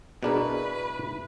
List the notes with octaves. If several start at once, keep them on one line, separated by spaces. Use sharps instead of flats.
B2 D4 E4 F#4 G#4 A#4 B4